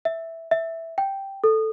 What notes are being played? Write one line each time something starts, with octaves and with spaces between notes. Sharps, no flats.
E5
E5
G5
A4